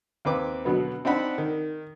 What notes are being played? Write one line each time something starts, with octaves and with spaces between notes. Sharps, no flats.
D#2 C4 B4 D6
B2 D3 F#3 B3
C4 D4 D#4 F#5 B5
D#3